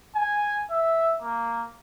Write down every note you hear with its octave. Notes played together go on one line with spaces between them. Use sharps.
G#5
E5
A#3